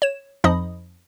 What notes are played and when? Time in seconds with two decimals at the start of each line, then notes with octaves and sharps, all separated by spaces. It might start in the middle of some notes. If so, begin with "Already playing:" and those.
0.02 C#5 E7
0.44 F2 F3 D#4 D#5 B5 D#6